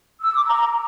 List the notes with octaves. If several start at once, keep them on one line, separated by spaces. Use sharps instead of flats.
E6
D6
A#5